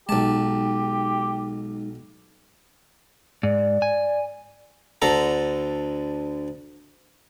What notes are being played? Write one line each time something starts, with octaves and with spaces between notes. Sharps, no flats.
B1 G#3 D#4 G4 A5
G#2 D5
G#5
D2 D3 A4 A#5